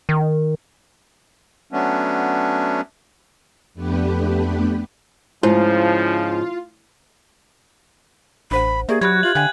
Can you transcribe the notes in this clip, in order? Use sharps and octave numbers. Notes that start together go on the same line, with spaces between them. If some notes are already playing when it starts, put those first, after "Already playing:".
D#3
F#3 A3 B3 C#4 D4
F2 A3 B3 D4 G4 B4
G#2 C#3 F3 E4 F4
A1 D4 C5 F#5 B5
A#3 G4 G#4 D5 E5
F#3 F#4 G4 B5 F#6 G#6
F4 E5 F#7
D3 F5 G5 G#5 F#6 G#6